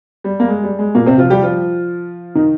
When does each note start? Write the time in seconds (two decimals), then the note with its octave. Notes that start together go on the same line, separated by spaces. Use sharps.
0.24 G3
0.40 A#3
0.48 G#3
0.63 G3
0.79 G#3
0.95 A#2 A#3
1.06 C3 C4
1.18 F3 F4
1.30 G3 G4
1.42 F3 F4
2.35 D#3 D#4